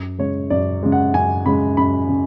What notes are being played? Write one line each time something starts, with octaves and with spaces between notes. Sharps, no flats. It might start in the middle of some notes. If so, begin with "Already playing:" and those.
Already playing: F#2
C#3 G#3 C#5
F#2 D5
C#3 G#3
F#5
F#2 G#5
C#3 G#3 B5
F#2 B5
C#3